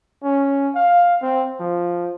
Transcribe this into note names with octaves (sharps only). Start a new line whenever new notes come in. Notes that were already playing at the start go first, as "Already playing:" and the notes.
C#4
F5
C4
F3